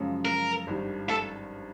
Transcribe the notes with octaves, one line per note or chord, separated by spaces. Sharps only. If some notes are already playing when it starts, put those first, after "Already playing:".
Already playing: F#2 C#3 F3 G#3
A#4
G#1 G2 D#3 G3
A4